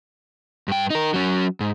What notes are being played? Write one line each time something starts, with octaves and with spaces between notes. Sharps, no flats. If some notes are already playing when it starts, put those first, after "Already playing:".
G2 G5
D#4 A#4
F#3 C#4
G#2